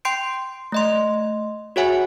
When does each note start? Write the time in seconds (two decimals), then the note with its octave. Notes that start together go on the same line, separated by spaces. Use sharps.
0.05 G5 C6 G6 C7 D7
0.72 A3 D#5 C6
1.76 F#4 G#4 C#5 E5 F#5 G#5